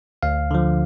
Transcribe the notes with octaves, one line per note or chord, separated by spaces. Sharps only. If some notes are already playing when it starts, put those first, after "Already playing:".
D2 F5
D3 F3